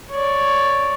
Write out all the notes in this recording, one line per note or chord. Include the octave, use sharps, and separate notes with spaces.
C#5 D5